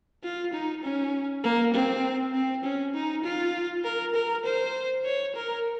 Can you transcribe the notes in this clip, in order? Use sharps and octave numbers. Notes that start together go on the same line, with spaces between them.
F4
D#4
C#4
A#3
C4
C4
C#4
D#4
F4
A#4
A#4
C5
C#5
A#4